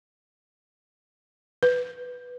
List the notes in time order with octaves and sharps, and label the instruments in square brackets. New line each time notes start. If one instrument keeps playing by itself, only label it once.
[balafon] B4